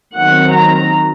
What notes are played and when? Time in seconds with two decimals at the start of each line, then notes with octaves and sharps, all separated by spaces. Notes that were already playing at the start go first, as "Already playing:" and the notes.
0.16 D#3 F#3 C4 F#5
0.54 A#5